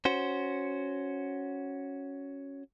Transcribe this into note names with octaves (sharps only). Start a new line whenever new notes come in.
C#4 F#4 C5